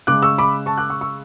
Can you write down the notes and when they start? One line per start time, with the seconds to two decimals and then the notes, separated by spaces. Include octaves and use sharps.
0.07 C#3 G#3 D6 F#6
0.23 C#6 E6
0.38 B5 D6
0.66 A5 C#6
0.77 D6 F#6
0.90 C#6 E6
1.01 C#6 E6